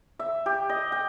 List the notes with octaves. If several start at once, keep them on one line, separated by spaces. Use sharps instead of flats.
E5
G4
D#5
G5